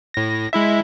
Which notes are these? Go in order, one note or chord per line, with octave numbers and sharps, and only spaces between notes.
A2 A#6
G#3 E4 E5